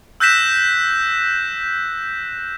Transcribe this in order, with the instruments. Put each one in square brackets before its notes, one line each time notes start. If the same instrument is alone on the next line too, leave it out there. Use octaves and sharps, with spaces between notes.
[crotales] E6 F#6 G6 A#6 B6 E7